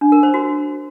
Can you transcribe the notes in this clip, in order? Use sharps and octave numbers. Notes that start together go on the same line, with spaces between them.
D4
A#4
C5
F#4